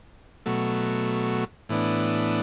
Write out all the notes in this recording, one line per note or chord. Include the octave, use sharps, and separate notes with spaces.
B2 F#3 A3
A2 E3 B3 D4